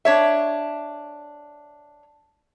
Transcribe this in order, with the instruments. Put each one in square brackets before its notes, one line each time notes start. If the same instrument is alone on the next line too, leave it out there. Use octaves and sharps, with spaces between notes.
[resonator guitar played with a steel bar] D4 C#5 E5